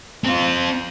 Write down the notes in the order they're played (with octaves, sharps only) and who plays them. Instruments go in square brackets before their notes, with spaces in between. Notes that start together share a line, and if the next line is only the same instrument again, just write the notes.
[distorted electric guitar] C4 F4